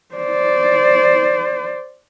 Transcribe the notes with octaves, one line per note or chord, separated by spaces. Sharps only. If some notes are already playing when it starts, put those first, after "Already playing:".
C5 D5